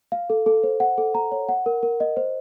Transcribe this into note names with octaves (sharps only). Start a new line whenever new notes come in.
F5
A4
A4
C5
F#5
A4
A#5
C#5
F#5
A#4
A#4
D#5
C5